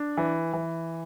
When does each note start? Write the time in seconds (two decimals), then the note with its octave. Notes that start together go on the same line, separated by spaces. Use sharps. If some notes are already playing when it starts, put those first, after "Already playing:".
Already playing: D4
0.17 E3
0.53 E3